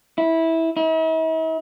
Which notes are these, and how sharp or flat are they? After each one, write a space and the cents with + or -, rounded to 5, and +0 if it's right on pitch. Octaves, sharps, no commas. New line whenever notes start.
E4 -15
E4 -45